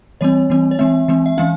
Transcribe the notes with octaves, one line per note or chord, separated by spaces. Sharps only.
E3 G3 C4 C#5
E3 G3 C4
C#5
E3 G#3 C4 E5
E3 G#3 C4
E5
E3 G#3 C#4 F5